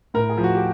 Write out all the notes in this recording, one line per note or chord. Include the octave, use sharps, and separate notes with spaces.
A2 A#4
G#4
F3
F#4
G4